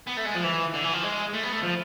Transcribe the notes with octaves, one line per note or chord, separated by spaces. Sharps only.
B3
A3
G#3
F3
E3
D3
E3
F3
G#3
A3
B3
A3
F3